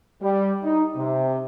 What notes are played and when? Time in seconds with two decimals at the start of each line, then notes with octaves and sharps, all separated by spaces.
0.22 G3
0.63 D#4
0.96 C3